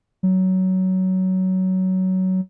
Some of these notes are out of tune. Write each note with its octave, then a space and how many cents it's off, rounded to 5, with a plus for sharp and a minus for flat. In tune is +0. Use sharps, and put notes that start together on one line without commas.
F#3 +15